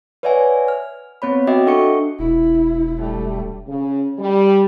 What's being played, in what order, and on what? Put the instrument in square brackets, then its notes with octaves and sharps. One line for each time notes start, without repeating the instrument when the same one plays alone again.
[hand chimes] B4 C#5 D5 E5 F#5 G#5
F6
B3 C4 C#5 B5
F#4 D#5 E5 G5 D6
D4 A4 F#5 C#6 C#7
[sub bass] E1 [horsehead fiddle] E4
[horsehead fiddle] G3 A3
[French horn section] C#3
G3